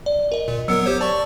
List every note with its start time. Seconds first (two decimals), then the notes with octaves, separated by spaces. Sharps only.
0.06 D5
0.32 A#4 D#5
0.48 A#2
0.68 F#3 B3 A#4 E6 C#7
0.86 G4 C5 C#5
1.01 D5 A5 C#6